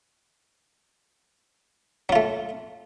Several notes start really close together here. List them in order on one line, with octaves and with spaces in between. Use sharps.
F#3 F4 A3